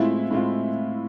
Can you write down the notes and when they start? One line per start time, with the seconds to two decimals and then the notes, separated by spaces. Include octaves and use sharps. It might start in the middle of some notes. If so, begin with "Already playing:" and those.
Already playing: A2 G#3 C4 E4 F4
0.31 A2 G#3 C4 F4